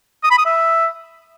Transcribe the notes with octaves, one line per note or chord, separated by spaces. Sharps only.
D#6
B5
D#6
E5